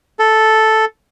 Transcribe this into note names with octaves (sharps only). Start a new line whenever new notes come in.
A4